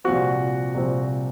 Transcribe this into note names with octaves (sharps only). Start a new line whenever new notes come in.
C2 A#2 F3 C4 F#4
C2 A#2 F3 C4